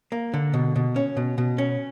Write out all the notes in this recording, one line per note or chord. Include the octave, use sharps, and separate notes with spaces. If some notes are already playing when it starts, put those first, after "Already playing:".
A#3
D3
B2
B2
C#4
B2
B2
C#4